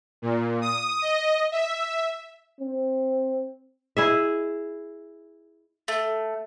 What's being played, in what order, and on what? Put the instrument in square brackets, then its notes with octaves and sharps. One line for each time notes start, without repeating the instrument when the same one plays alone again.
[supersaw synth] A#2
D#6
D#5
E5
[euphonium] C4
[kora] E4 G#4 E5
[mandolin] A3